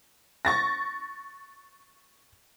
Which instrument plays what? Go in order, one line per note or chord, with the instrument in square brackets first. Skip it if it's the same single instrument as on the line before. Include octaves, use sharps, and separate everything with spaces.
[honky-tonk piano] C#6 A6 A#6